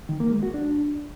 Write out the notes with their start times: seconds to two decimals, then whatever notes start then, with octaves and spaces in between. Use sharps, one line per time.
0.09 D#3
0.20 A#3
0.31 G#3
0.43 F#4
0.54 D4